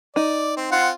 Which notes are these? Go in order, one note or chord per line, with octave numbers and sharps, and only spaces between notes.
D#4 D5
C4
C4 F4 F#5